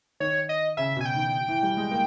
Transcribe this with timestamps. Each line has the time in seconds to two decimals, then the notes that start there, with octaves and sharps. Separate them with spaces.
0.20 D#3 C#5
0.49 D#5
0.77 C#3 E5
0.96 B2 G#5
1.05 G5
1.16 D#3
1.48 E3
1.63 G3
1.77 G#3
1.92 A#3